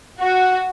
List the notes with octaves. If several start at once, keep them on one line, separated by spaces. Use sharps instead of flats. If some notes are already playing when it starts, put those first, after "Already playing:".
F#4